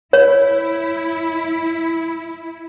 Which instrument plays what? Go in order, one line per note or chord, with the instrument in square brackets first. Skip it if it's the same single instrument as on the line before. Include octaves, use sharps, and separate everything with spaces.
[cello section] E4 [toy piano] C#5